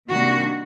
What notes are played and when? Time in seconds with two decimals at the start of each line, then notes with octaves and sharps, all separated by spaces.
0.09 C3 D#3 G3 A#3 D4 F#4